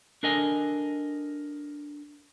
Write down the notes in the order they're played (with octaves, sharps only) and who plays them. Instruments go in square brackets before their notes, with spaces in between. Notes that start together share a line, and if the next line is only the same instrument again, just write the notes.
[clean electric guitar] D4 A4 A#4 D#5 G#5